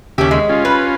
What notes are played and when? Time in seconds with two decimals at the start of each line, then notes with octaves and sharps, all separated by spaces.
0.18 D#2 C#3 C#4 G4 E5
0.31 G#3
0.49 C#4 F4
0.65 B4